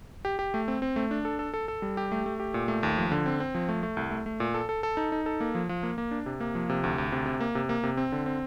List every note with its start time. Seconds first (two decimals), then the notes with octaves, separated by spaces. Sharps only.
0.25 G4
0.39 G4
0.54 A3
0.68 C4
0.82 C4
0.96 A3
1.11 D4
1.25 A4
1.39 A4
1.54 A4
1.68 A4
1.82 G3
1.97 G4
2.12 A3
2.26 A3
2.40 G4
2.54 A#2
2.68 A3
2.83 D#2
2.97 F3
3.12 D3
3.26 C4
3.40 C4
3.55 F3
3.69 A3
3.83 A3
3.97 C2
4.11 A3
4.26 A3
4.40 A#2
4.54 A4
4.69 A4
4.83 A4
4.97 D#4
5.12 D#4
5.26 A4
5.41 A#3
5.55 F3
5.69 F3
5.83 A#3
5.98 A#3
6.11 D4
6.26 C3
6.40 A#3
6.55 F3
6.70 C3
6.84 D2
6.98 D2
7.12 C3
7.26 C3
7.40 A#3
7.55 C3
7.69 A#3
7.83 C3
7.97 C4
8.12 D3
8.26 C4